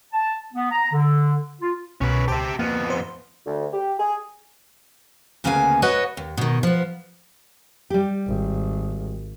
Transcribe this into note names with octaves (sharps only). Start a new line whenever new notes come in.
A5
B3
A#5
D3
F4
C2 B2 C#4 B4
C#2 G4 C5 E5 A5
F2 A#3 B3
C5
D2
G4
G#4
D2 C#3 A#3 B3 F5 G#5
F#4 B4 C#5 D#5 F#5
D#2
B2 D#3
F3 B3
G3 G4
G#1